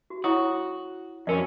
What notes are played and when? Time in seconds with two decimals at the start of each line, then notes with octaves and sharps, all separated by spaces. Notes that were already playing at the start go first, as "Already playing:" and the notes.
0.10 F#4
0.24 E4 F#4 C#5 D#6
1.27 F2 C#4 F#4 A#4 D5